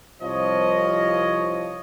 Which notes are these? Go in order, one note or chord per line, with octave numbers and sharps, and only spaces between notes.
C2 F3 C#5 D#5